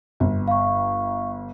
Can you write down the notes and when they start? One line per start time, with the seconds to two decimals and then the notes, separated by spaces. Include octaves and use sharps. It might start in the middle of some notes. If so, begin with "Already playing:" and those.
0.20 G1
0.48 F5 C#6